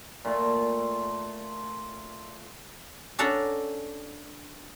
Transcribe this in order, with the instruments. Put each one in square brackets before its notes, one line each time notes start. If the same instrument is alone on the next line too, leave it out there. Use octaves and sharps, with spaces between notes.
[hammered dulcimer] A#2 A3 F4
[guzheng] C#4 D4 A4 D5 F#5 A#5